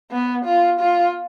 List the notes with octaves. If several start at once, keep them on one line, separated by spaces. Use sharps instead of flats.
B3
F4
F4